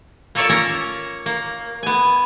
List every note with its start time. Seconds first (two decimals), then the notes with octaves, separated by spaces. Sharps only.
0.35 A#3 F4 A4 C#5 D5 E5
0.49 A#3 C#4 A#4 C#5 A#5
1.26 A#3
1.83 B3 G#5